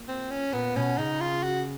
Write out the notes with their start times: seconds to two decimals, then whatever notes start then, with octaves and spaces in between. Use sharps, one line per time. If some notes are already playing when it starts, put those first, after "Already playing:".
Already playing: A#2
0.08 C4
0.31 C#4
0.53 A#2 B3
0.76 B2 C#4
0.98 C#3 D#4
1.21 F4
1.43 F#4